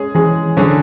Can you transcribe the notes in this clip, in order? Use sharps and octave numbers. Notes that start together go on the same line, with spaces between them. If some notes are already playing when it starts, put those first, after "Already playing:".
Already playing: G#3 C#4 G#4
E3 G#3 C#4 G#4
D3 F#3 C#4 G#4